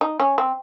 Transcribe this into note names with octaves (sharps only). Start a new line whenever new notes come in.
D#4
C#4
C4